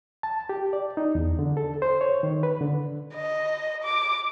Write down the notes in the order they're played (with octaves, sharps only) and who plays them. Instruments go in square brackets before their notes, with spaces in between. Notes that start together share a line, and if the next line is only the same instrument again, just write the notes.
[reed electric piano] A5
G4
D5
D#4
E2
D3
A4
C5
C#5
D#3
B4
D3
[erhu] D#5
D6